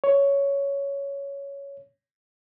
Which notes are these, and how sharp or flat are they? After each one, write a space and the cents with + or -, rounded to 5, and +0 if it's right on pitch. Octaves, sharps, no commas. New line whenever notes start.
C#5 +10